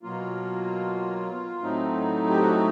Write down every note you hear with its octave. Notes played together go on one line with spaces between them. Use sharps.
B2 F#3 A#3 F4
A2 F#3 A3 C4 D#4
G4
F#4